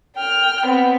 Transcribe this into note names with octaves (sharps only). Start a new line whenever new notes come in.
G5 F6
B3 C4